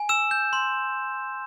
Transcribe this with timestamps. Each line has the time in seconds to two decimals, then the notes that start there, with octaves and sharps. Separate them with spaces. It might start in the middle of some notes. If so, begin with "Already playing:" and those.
Already playing: G#5
0.09 E6 E7
0.31 G6
0.53 C6